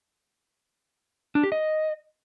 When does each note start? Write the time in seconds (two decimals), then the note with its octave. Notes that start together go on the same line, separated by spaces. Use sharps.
1.35 D4
1.44 G4
1.52 D#5